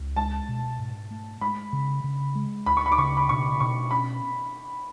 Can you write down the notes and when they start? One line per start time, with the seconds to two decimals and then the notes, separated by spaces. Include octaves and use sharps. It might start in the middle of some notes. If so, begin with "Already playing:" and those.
Already playing: C#2
0.16 G#3 A5
0.49 B2
0.79 G#2
1.11 A3
1.41 G#3 B5
1.73 C#3
2.04 C#3
2.35 G#3
2.66 D2 B5
2.77 C#6
2.86 B5
2.92 D6
2.98 C#3 C#6
3.17 B5
3.29 B2 C#6
3.60 B2 C#6
3.91 C#4 B5